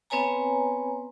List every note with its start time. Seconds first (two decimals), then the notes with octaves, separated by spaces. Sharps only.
0.10 B3 C4 B4 C#5 G#5 A#5